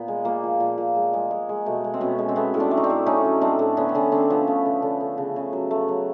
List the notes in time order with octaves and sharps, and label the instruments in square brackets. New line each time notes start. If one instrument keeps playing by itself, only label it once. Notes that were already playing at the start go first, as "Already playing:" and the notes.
Already playing: [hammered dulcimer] A#2 B3
G#3
A#2 A#3
F3
A#2
A#2
G#3
G#3
G#3
G#3
B2 A3
G#3
C4
B2 B3 C#4
G#3
C4
A3 B3 C#4
A2
C4 D4
A3
D#4
C4 D4
A2
A3 C#4 D#4
F#3
A3 C4 D4
A2
D3 B3 C#4
C4
D3 B3 C#4
D3 C4 D4
F3 B3 C#4
A3
D3
D3
D3
C#3
C#3
F#3
A3
F#3